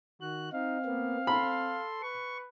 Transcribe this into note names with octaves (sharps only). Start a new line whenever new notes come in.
D#3 F#4 F#6
C4 D#4 F5
A#3 B3
A4 B5 C6
B4 C#6